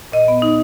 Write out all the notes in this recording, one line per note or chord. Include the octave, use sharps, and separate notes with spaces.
A#2 D#5
B3
D#4